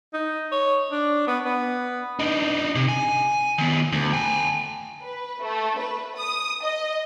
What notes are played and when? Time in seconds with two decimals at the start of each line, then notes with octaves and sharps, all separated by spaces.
0.14 D#4
0.52 C#5
0.92 D4
1.28 B3
1.45 B3
2.19 D4 D#4
2.75 C3
2.89 G#5
3.58 D#3 B3
3.92 D2
4.13 G5 G#5
5.02 B4
5.43 A3
5.78 B4
6.16 D#6
6.63 D#5